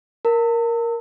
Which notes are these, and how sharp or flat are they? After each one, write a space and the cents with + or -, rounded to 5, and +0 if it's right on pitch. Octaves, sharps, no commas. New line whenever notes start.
A#4 +0 A5 +45